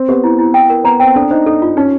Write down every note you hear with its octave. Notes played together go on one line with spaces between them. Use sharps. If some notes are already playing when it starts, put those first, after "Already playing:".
Already playing: C4
B3 G4
E4
E4
G5
A#4
B3 A#5
C4 G5
D4 A4
D#4 C5
D#4 A4
F4
C#4 D#4